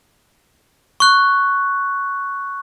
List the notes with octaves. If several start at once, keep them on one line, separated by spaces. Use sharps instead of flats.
C#6 F#6